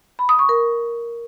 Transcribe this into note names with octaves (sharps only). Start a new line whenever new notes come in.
B5
D#6
C#6
A#4